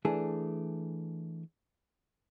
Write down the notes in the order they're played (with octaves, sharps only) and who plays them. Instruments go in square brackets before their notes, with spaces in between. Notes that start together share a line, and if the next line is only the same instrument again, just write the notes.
[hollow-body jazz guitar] E3 A3 D4 G#4